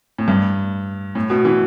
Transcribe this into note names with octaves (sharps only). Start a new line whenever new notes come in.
A2
G2
A2
B2
E3